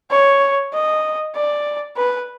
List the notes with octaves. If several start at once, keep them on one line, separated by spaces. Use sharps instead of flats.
C#5
D#5
D5
B4